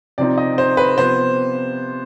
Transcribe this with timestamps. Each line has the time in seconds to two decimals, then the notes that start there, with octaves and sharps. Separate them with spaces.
0.18 C3 F3 C4 D#4 D5
0.38 D#5
0.58 C5
0.77 B4
0.97 C3 F3 B3 C5